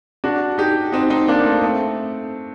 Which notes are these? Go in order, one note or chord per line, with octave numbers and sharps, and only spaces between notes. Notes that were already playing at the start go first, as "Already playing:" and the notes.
D4 F#4
D#4 G4
C4 D#4
C4 D#4
A#3 D4
A3 C4
A3 C4